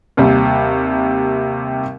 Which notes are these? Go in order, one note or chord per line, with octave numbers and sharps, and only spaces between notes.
D#2 C3 G3